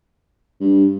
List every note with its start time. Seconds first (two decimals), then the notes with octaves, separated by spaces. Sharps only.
0.61 G2